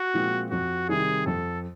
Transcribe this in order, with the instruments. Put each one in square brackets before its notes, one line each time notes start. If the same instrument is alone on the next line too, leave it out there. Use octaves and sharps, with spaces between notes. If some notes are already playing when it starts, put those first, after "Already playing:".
Already playing: [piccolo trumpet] F#4
[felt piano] A#2 F3 G#3 C4
[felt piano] F2 [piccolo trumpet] F#4
[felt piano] C3 D#3 G3 [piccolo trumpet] G#4
[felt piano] F2 [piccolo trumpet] A4